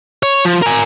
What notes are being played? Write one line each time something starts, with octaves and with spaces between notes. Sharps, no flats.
C#5
F3
A#4 G#5